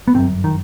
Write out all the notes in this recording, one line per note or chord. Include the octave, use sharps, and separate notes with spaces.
B3
G1 F#2 C4
D#3